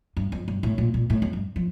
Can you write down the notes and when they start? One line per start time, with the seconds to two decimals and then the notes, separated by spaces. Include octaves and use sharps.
0.17 G2
0.32 F2
0.48 G2
0.63 A2
0.78 A#2
0.94 A#2
1.10 A2
1.22 F2
1.33 G2
1.56 F3